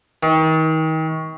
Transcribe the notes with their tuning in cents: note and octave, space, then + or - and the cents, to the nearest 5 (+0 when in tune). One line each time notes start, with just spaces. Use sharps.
D#3 +35